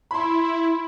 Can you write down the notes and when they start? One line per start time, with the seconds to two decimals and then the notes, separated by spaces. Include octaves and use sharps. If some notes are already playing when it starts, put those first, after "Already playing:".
0.11 E4 B5 C6